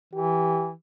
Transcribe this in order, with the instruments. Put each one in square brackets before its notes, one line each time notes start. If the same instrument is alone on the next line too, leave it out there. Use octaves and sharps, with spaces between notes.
[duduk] E3 [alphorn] G4